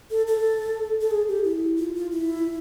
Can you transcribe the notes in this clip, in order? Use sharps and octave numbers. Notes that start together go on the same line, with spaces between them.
A4
A4
A4
G#4
G4
E4
F4
F4
E4